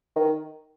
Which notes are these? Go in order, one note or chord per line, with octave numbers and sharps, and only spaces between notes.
D#3